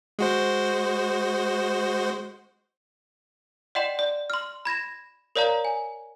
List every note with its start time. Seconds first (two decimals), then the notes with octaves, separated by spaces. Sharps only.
0.19 G#3 F#4 C5
3.75 D5 D#5 F#5 G5 C6 E7
3.99 D5
4.30 C6 F6
4.65 B5 G#6 A#6 E7
5.36 A#4 C#5 D5 F5 A#5
5.65 G#5